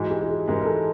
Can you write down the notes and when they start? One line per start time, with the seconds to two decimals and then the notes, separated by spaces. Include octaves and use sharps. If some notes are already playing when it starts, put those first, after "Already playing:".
Already playing: G#2 E3 G#3 F#4
0.10 G4
0.22 G4
0.28 G#4
0.48 G#2 E3 G#3 A#4
0.61 A#4
0.65 A4